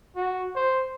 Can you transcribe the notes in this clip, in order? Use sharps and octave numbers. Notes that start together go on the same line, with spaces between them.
F#4
C5